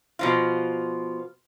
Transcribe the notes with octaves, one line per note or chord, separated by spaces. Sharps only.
B2 F3 F4